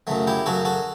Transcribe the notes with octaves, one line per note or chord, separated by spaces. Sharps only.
F#2 C#3 F#3 A3
E4 G4
F#2 C#3 F#3 F#4 A4
F#4 A4